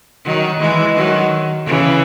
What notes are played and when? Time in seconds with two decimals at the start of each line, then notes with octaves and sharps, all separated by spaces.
0.25 D#3 F#3
0.60 E3 G#3
0.96 D#3 F#3
1.66 C#3 E3